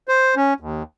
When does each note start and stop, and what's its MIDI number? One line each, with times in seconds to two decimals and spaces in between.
0.08 0.35 72
0.36 0.54 61
0.60 0.83 39